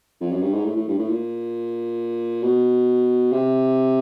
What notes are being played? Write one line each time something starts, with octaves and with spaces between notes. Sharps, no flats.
F2
F#2
G2
G#2
A2
A2
G2
A2
A#2
B2
C3